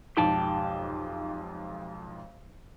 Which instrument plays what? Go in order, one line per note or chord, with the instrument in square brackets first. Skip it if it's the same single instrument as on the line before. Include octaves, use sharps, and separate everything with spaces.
[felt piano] B1 F2 G#2 [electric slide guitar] G4 G5 A5